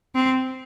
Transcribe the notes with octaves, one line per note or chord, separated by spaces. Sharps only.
C4